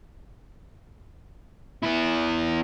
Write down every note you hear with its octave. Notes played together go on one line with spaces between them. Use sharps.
B3 E4